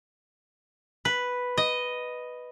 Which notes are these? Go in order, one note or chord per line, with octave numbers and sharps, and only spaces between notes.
B4
D#5